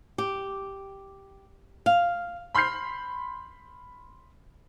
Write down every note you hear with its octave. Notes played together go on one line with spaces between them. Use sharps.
G4
F5
B5 C6 F6 G6 C7